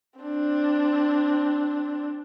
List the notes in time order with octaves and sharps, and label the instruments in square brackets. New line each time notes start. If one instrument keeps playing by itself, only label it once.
[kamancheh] C4 D4